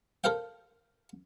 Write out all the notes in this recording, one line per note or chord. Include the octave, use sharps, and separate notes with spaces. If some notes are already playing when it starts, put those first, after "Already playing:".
A4 A#4 C5 F5 G5